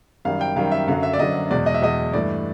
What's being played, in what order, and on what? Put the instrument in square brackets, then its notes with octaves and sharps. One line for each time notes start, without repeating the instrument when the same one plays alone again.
[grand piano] F#2 D#3 G3 F5
G5
F#2 D#3 G3 F5
E5
F#2 D3 F#3 F5
E5
D5
F#2 D3 F#3 D#5
E2 B2 G#3 D5
D#5
E5
E2 B2 G#3 D#5
G2 E3 A3 D5